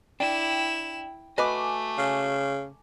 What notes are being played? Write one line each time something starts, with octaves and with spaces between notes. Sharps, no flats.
D4 E4 G5 E7
A3 F#4 B4 D#5 G#5 D6
C#3